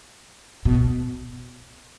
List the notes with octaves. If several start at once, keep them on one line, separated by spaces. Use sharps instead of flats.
B2